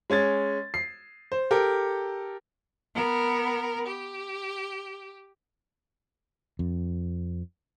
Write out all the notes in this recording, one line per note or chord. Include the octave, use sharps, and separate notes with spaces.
G#3 C#4 G#6 A6
C7
C5
G4 A4 A#4
B3 A#4
G4
F2